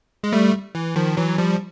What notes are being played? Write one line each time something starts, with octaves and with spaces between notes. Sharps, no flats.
G#3
G3 A3
E3
D#3 F3
E3 F#3
F3 G3